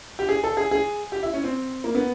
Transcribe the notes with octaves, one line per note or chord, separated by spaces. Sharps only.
G4
G#4
A4
G#4
G#4
G4
E4
C#4
C4
A#3
B3